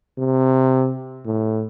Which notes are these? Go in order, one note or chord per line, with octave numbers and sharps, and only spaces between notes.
C3
A2